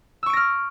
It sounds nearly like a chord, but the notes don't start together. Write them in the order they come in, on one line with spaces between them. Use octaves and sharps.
E6 C#6 D7 A#6 F6